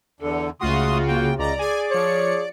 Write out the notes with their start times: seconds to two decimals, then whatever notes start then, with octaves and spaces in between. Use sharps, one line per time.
0.20 E2 D3 A4
0.61 C#2 C#3 A3 F4 F#4 C6 D#6
1.08 A#3 G5
1.39 C#2 D5 D#5 A#5
1.59 G#4 G#5
1.91 F3 C#5 C#7